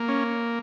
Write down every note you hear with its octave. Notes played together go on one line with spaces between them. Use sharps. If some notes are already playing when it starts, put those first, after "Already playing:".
Already playing: A#3
C#4